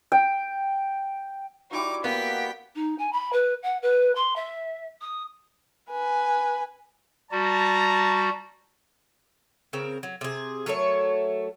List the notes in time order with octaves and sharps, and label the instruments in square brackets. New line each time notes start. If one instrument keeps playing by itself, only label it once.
[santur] G5
[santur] G3 E4 F#4 [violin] D#4 D6
[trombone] A#3 [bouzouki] B3 [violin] G5 B6
[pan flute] D#4
G#5
B5
B4
F#5
B4
C6
E5
D#6
[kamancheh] B4 G#5
[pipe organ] G3 F#4 [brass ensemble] A5 A#5
[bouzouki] C#3 C4 A#4
F#3
C3 G#4
F#3 A3 A#4 C#5